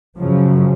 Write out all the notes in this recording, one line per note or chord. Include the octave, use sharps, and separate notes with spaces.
F#2 C#3 F3